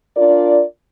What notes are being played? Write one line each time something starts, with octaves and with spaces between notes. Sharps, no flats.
D4 F4 A#4 D5